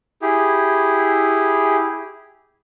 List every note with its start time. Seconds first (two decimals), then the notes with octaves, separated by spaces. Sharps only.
0.22 E4 G4 G#4